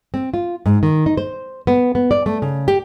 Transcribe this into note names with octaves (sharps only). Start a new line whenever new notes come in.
C4
F4
G#2
D#3
D#4
C5
B3
B3
D5
A3
C#3
G4